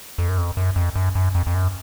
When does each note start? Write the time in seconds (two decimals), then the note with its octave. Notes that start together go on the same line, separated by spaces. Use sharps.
0.18 F2
0.29 F#2
0.38 F2
0.57 F#2
0.76 F2
0.96 F#2
1.15 F#2
1.35 F2
1.47 F2
1.54 F#2